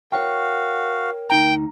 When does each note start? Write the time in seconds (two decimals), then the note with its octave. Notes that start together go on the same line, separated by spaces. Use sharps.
0.12 F#4 A#4 C#5 F5 G5
1.30 D2 D#4 G5 A#5